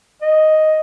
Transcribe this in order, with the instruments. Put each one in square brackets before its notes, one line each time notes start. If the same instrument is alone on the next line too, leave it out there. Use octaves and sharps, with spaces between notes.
[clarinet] D#5